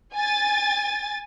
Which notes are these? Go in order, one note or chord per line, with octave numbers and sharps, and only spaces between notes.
G#5 A6